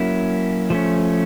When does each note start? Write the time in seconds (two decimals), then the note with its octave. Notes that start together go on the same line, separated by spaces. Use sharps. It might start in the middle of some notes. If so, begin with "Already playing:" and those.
Already playing: F#3 A#3 C#4 E4
0.70 F3 A3 C#4